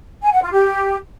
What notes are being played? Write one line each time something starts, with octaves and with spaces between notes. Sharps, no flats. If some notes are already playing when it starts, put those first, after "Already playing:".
G#5
F#5
F4
G4